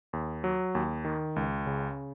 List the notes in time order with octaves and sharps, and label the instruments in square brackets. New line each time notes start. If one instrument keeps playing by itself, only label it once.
[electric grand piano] D#2
F#3
D#2
D#3
C#2
C#3